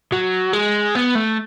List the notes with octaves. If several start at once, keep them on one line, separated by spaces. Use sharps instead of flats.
F#3
G#3
B3
A3